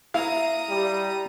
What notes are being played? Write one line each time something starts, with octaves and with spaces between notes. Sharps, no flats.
E4 F5 A#5 D#6
G3